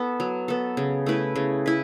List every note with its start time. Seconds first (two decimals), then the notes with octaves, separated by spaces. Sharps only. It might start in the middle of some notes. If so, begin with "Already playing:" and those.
Already playing: B3 A4
0.20 F#3
0.48 B3 A4
0.77 C#3
1.06 A3 E4 B4
1.36 C#3
1.66 E4 B4